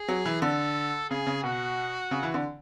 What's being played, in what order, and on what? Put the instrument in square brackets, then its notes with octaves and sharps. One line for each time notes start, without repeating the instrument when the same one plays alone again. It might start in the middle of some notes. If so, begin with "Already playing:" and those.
Already playing: [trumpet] G#4
[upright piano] F#3
E3
[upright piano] D3 [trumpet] A4
[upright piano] C#3 [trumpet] G#4
[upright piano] C#3
[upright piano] B2 [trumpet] F#4
[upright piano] C#3
E3
D3